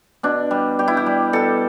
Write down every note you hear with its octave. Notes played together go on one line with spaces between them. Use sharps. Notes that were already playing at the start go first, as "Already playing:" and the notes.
B2 D4
G3
G3 G4
E4
G4
G3
B2 A4